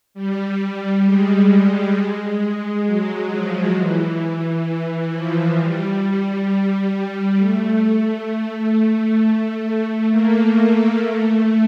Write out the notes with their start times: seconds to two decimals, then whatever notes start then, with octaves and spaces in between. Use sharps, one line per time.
0.14 G3
1.05 G#3
1.95 G#3
2.40 G#3
2.86 F#3
3.30 F3
3.75 E3
4.22 E3
4.66 E3
5.12 F3
5.57 G3
7.37 A3
10.10 A#3
10.55 A3
11.00 A3